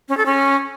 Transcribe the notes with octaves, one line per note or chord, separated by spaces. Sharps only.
C#4
A4
C#4